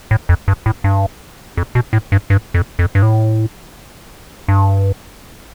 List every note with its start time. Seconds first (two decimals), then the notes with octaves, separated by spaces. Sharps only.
0.11 A2
0.29 F2
0.48 G2
0.66 A2
0.84 G2
1.57 F2
1.75 B2
1.93 A2
2.12 G2
2.30 G2
2.54 F2
2.79 F2
2.95 G2
3.02 A2
4.48 G2